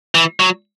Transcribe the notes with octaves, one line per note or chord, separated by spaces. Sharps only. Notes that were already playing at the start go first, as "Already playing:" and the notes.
E3
F#3